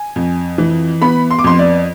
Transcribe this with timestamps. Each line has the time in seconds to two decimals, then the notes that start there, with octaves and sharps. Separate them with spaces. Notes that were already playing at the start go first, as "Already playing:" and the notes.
Already playing: G#5
0.16 F2
0.58 E3
1.02 B3 B5
1.31 C6
1.39 D6
1.44 F2 C6
1.59 D5